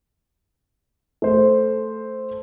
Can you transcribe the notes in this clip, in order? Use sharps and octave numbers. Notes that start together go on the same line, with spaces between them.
A3 C5